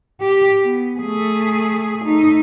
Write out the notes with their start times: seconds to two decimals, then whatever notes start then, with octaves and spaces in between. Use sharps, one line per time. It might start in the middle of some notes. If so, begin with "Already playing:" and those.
0.21 G4
0.63 B3
1.00 A3 G#4
2.05 A3 D#4